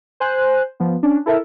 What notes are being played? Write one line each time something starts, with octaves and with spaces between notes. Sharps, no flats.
C5 G#5 F#6
F3 B3
C#4 D4
E4 A4 A#4 E5